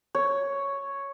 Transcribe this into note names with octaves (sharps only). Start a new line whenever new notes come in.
C#5